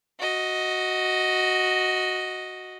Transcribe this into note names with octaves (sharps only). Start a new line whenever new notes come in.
F#4 D#5